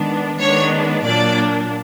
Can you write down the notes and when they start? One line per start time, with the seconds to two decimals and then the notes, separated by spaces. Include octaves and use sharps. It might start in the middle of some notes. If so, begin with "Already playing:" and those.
Already playing: D#3 G#3 B3 D4
0.40 D#3 G#3 B3 D4 C#5
1.05 A#2 F#3 A#3 D4 D5